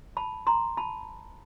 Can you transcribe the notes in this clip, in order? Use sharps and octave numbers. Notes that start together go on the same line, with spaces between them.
A5 B5
A#5 C6
A5 B5